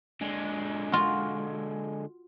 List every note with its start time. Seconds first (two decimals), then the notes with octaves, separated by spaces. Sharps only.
0.21 D3 G#3
0.92 F4 F#4